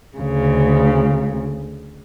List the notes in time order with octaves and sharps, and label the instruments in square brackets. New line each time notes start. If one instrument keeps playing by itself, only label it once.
[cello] D2 C#3